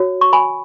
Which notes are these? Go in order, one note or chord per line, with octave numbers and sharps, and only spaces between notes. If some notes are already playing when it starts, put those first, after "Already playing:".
Already playing: F#4 C#5
C#6
G#5 B5